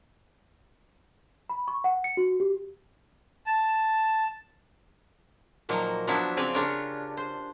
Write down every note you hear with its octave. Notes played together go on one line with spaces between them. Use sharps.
B5
C#6
F#5
C#7
F#4
G4
A5
A#2 D#3 F3 F#3 A#3
F3 F#3 B3 D4 E4 E5
C#3 C4 D5 F5 G#5
C#3 D4 F4 G4 A#4 C#5
C5